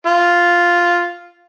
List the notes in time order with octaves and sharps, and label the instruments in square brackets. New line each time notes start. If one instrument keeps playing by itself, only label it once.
[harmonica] F4